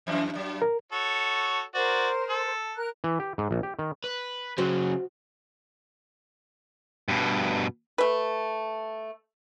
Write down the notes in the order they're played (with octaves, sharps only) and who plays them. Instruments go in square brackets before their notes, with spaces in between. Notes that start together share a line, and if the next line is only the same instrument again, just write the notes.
[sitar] F2 E3 D4
G2 F#3
[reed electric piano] A#4
[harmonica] F#4 A4 C#5
[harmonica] F#4 D5 [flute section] A#4 C5
[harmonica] A4
[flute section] A#4 F#6
[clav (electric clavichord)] E3
G4
G#2
A#1
G4
D#3
[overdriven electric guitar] B4
[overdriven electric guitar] C#3 F#3 [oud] F#4 C5
[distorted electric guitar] G2 B2
[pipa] A3 B4